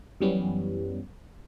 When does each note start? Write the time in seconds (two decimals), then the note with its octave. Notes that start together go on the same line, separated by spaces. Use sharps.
0.21 F#2 E3 G3 B3 C#4